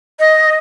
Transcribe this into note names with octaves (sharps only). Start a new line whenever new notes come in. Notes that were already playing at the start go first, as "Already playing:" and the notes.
D#5